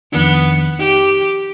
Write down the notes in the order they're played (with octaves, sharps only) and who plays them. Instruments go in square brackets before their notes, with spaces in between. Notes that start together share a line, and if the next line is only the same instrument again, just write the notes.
[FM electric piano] F2 D#3 D4 [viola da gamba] B3
[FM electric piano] D#4 [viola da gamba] G4